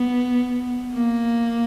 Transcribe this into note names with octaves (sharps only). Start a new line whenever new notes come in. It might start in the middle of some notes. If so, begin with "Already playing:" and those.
Already playing: B3
A#3